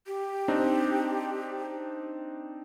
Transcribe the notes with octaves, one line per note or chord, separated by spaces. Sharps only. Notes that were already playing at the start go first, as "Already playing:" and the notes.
G4
C4 D4 D#4